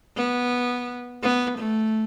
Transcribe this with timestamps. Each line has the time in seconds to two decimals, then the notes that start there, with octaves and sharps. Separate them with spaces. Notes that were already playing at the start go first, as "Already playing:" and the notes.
0.16 B3
1.22 B3
1.58 A3